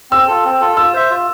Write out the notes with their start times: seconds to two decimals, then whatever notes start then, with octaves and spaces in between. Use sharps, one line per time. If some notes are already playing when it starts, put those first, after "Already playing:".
0.11 C4 E6
0.28 F4 A4
0.45 C4
0.61 F4 A4
0.77 F4 E6
0.94 C5 E5
1.11 F4